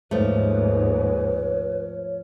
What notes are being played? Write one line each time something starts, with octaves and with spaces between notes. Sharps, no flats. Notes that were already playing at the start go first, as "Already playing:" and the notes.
D#2 G#2 F3 A3 B4 C#5